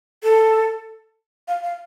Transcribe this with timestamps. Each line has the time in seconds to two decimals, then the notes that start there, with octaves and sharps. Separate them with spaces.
0.23 A4
1.48 F5
1.63 F5